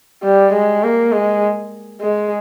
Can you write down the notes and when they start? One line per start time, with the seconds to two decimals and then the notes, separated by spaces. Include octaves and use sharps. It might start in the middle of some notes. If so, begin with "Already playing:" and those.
0.23 G3
0.53 G#3
0.83 A#3
1.12 G#3
2.01 G#3